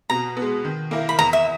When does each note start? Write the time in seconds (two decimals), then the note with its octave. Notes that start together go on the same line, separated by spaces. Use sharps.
0.10 B2 A#5
0.37 B3
0.42 G#3
0.65 D#3
0.91 A#3 E4 A#4
1.09 B5
1.18 E2 A#5
1.33 E5